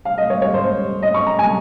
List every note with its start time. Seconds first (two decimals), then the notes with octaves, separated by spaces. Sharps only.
0.05 F5
0.18 D#5
0.30 C#5
0.42 C#5
0.54 C5
1.03 D#5
1.14 C#6
1.27 A#5
1.39 G#5